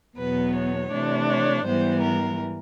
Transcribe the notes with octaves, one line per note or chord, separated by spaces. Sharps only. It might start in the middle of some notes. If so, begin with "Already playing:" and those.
E2 B2 F#3 B3 B4
C#5
C3 E3 A3 D4
C#5
G#2 E3 G3 B3 C5
A#4